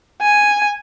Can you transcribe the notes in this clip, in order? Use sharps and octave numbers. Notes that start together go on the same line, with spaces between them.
G#5